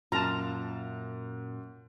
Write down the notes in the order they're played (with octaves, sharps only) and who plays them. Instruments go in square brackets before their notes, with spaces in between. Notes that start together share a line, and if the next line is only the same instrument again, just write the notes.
[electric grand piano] F#2 [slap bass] A#2 A#3 [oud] F4 [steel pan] A5 A#5